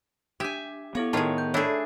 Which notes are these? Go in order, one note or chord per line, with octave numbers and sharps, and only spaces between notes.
D4 G4 E5 G#5
B3 E4 A4 C#5 F5
A2 D#3 F4 G#4 C#5 A5
G6
A3 D4 E4 G#4 C#5 D5 G#5